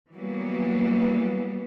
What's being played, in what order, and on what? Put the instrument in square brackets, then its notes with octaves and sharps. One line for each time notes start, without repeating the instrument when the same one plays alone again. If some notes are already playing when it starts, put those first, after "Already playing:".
[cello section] E3 F#3 G3 A#3 B3